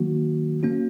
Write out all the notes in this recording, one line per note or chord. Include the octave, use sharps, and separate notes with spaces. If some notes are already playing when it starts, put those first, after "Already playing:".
Already playing: D#3 F#3 A#3 F#4
A#3 C#4 F#4